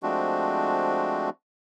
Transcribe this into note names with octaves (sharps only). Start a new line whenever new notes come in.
F3 G#3 A3 C4 D4 F#4